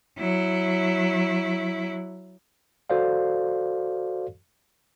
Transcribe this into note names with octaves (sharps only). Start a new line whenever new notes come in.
F#3 E4
F#4 A4 C5 D5 F5